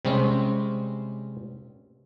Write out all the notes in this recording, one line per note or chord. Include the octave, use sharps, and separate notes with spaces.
C3 G3 G#3 C4 C#4